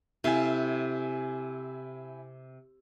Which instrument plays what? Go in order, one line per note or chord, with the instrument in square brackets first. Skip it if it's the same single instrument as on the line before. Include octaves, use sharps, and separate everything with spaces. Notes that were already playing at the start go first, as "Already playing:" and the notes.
[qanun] C3 A4 F5 [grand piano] E4 G#5